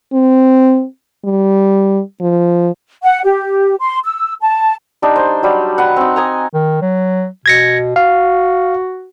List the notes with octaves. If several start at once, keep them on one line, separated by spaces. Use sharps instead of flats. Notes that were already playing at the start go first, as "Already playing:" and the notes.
C4
G3
F3
F#5
G4
C6
E6
A5
G3 D4 D#4
C5
F#3 G3
B4 F#5
C4 D#4
D#5 G#5 A#5
D#3
F#3
B2 G#6 A#6 C#7
F#4 F5